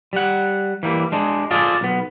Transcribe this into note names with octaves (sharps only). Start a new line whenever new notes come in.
G3 F#5
E3 G3 A#3
G#3 D4
F4 G#4 A4 D5
B1 B3